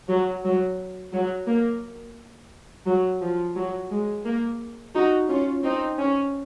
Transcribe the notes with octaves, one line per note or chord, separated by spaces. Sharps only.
F#3
F#3
F#3
A#3
F#3
F3
F#3
G#3
A#3
D#4 F#4
C#4 F4
C4 D#4
C#4